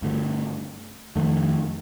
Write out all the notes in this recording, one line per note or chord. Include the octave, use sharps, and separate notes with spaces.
G2 D3 A3
F2 D#3 A3